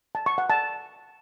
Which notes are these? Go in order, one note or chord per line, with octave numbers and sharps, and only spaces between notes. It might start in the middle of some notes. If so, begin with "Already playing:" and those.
A5
C#6
F#5
A5